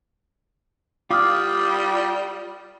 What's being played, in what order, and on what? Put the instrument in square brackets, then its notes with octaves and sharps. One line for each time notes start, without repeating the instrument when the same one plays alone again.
[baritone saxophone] G3 [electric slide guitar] F4 [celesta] D6 D#6 F6